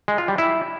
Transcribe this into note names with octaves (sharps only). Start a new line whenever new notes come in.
G#3
F4
G3
E4